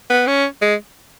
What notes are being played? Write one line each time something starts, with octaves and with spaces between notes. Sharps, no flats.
B3
C#4
G#3